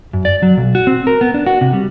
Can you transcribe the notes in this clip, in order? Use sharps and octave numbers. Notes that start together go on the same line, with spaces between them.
F#2
D5
F#3
B1
F#4
C4
A#4
B3
D4
F#4
C3
G3